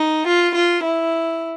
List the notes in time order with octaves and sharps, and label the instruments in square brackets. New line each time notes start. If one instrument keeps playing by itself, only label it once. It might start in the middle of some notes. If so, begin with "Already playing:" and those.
Already playing: [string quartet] D#4
F4
F4
E4